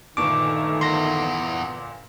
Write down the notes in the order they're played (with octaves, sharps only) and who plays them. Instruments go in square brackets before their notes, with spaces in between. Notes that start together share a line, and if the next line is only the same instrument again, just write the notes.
[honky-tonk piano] G1 A#2 C#6 [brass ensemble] D#3 A3 [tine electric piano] D6
[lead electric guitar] E2 [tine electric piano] C6 A#6